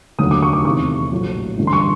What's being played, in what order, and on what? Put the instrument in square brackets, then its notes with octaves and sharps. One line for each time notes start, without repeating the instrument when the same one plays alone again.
[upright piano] F1 D#2 D3 F#3 D#6
D6
C#6
D6
E2 C3 D#3 C#6
A#1 A2 F#3
A1 G2 D3
C6
C#6